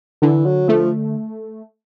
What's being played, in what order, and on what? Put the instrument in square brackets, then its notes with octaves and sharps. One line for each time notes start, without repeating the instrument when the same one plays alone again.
[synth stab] D3 [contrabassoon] E3
[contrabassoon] F#3
[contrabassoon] F3 [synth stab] A3